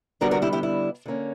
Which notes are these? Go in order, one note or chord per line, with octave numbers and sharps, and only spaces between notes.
D3 G3 B3 D4 F#4 A#4
F#4 A#4
E4 G4
E4 G4
E4
D3 A#3 C#4